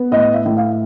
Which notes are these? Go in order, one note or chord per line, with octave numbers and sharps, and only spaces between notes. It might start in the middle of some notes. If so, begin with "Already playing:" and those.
Already playing: B3
A2 D#5
E5
A2
F5